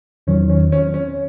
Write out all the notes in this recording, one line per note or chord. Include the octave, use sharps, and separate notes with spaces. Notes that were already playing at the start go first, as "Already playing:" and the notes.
E2 D#3 F#3 C#4
C#4
C#4
C#4